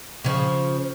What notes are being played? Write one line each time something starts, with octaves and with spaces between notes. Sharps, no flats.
C#3 F3